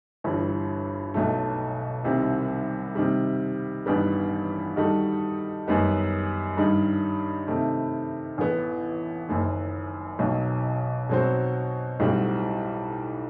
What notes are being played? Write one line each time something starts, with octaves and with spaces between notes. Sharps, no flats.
G1 G2 E3 G3
B1 B2 F#3 A3
C2 C3 D#3 G3
C3 D#3 G3
A1 G2 D#3 G3 B3
D#3 G3 D#4 F#4 A4
F#2 D#3 G3 B3 D#4
G2 D#3 G3 D#4
C3 D#3 A3
A1 A2 E3 B3
F#1 F#2 D#3
B1 B2 F#3
B2 F#3 C4 F#4 C5
B1 A2 G3 C4 F#4